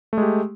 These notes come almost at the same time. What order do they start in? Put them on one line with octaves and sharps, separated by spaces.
A3 G#3 G4